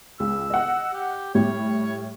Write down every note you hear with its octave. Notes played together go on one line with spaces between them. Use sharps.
C#2 E6
D#5 F#5
G4
A2 G3 C#5